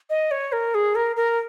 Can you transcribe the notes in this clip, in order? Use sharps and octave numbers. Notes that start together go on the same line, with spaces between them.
D#5
C#5
A#4
G#4
A#4
A#4